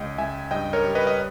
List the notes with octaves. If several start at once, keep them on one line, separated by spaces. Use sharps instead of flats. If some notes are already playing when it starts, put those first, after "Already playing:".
Already playing: C#2 D#5 G5
C#2 E5 G#5
G2 D#5 G5
A#4 C#5
G3
B4 D#5
D#5